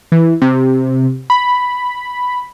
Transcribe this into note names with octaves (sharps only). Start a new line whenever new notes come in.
E3
C3
B5